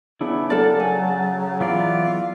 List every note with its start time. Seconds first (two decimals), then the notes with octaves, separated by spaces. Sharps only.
0.21 C#3 B3 D4 E4
0.50 F#3 A4 A#4 D5 A5
0.80 G#5
1.60 E3 B3 F4 D5